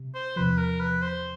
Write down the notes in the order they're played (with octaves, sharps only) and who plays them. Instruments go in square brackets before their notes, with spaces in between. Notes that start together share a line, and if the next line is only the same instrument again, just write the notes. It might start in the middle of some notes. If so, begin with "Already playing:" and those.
Already playing: [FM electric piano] C3
[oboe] C5
[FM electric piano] E2 C3 F3 [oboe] B4
[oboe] A#4
B4
C5